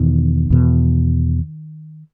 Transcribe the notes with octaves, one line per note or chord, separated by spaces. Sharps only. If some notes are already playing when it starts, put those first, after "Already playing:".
Already playing: E2 B2 D#3
E2 B2